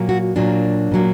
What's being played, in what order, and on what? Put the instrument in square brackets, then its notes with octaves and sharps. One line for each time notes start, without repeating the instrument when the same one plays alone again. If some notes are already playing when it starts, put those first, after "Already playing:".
Already playing: [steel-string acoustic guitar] A#2 F#3 A#3
F#4
A#2 F#3 A#3 D4
A#2 F#3 A#3